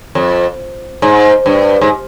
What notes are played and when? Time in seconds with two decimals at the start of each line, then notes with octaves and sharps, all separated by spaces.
0.15 F2
1.02 G#2
1.46 G2
1.81 G#2